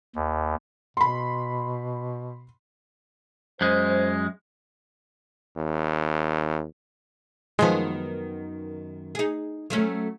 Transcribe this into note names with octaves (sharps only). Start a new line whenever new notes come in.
D#2
B2 B5 C6
F#2 G#3 C5
D#2
F#2 D#3 F3 G#3 B3
D#4 G#4
F#3 A3 C#4